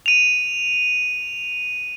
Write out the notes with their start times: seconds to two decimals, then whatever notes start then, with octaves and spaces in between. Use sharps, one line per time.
0.06 D#7 F7